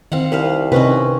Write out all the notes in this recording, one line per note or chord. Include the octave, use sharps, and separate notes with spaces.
D#3 C4 F5 F#5
C2 B4 C5 F5
C3 C4 C#4 D#4 B4